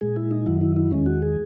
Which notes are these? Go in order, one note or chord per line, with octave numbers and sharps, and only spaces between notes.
A#2 G#3 G#4
E4
D#4
F#2 D#3 F#3 E4
E4
E4
E2 D#3 G#3 C#4
F#4
G#4